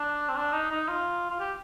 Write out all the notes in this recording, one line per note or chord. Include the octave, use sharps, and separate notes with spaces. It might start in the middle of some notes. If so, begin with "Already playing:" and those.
Already playing: D4
C4
D4
D#4
D#4
F4
F4
G4